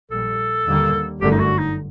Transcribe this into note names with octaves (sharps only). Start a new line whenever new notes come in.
A#1 A#2 G3 A4
D#2 D3 G3 A#3
G1 F#2 D3 A3 G4
D#4
F#4
D#4